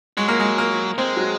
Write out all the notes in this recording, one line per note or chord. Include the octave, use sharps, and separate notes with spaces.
F#3 G#3
A#3
G#3
A#3
G#3 C4
F#3